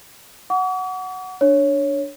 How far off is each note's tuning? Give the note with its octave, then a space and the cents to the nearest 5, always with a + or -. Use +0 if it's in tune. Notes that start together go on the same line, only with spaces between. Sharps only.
F#5 +0 C#6 +45
D4 +0 C#5 +0